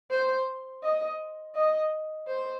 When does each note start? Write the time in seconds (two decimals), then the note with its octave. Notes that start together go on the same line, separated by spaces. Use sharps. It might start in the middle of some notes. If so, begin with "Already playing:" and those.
0.11 C5
0.83 D#5
1.55 D#5
2.28 C5